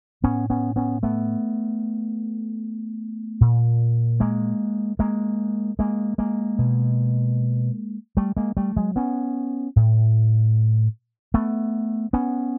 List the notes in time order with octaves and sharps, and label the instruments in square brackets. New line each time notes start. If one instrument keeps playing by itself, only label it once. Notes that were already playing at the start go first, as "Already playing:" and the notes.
[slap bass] A2 B3 C#4
B3 C#4
B3 C#4
A3 B3
A#2
G#3 A#3
G#3 A#3
G#3 A#3
G#3 A#3
B2
G3 A3
G#3 A#3
G3 A3
F#3 G#3
B3 C#4
A2
A3 B3
B3 C#4